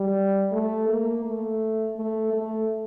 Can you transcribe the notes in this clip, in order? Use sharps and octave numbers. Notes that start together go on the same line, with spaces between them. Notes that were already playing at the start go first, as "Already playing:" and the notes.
Already playing: G3
A3
A#3
A3
A3
A3